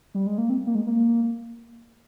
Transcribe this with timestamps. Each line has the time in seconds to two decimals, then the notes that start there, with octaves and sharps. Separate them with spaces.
0.14 G3
0.26 G#3
0.38 A#3
0.50 C4
0.67 A#3
0.75 G#3
0.87 A#3